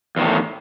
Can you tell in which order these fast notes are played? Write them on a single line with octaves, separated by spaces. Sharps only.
E2 D#3 A2